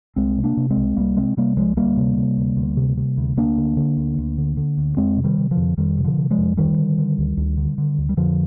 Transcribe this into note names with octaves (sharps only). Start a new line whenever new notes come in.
C2 G#3 C4
C3
A#3 D4
C3
G#3 C4
C2
C2 G3 A#3
C3 G#3 C4
C3 G3 A#3
C2 F3 G#3
D2 G3 A#3
C3
C3
D2
D2
C3
C3
D2
D2 A#3 D4
D3
D3
D2
D2
D3
D3
D2
F2 G#3 C4
C3
D#3 G3
C3
D3 F3
F2
F2 D#3 G3
C3
D3 F3
C3
F3 G#3
F2
D2 D#3 G3
D3
D3
D2
D2
D3
D3
D2
G3
F2 D3 F3